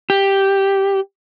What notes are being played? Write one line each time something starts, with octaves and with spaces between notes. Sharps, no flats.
G4